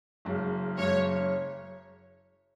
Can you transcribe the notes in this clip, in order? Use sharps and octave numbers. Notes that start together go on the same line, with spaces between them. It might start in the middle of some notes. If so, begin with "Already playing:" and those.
F#1 F#2 C#3
F#1 F#2 C#3 C#5